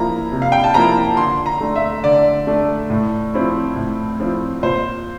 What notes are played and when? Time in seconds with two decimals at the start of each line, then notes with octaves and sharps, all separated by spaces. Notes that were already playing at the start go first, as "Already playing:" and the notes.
Already playing: F3 A#3 E4 A#5
0.32 C3
0.42 F5
0.52 G5
0.64 A5
0.74 F3 A#3 E4 A#5
1.17 D3 C6
1.46 A#5
1.61 A3 D4
1.76 E5
2.03 D3 D5
2.47 A3 D4
2.90 A2
3.34 F3 C4 E4
3.76 A2
4.20 F3 C4 E4
4.62 A#2 C5